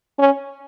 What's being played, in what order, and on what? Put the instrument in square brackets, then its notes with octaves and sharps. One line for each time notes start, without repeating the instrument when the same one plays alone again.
[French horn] C#4